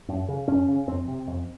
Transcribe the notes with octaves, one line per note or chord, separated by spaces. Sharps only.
F#2
C#3
F#2 C#4
C#3
F2 C4
C3
F2